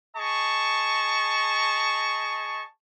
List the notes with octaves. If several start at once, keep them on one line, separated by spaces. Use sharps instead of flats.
G#4 D#5 A5 C#6